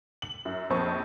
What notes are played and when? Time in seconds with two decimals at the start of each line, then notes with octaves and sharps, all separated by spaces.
0.22 F#7
0.45 F#2
0.70 A#1 F2 C5 C#6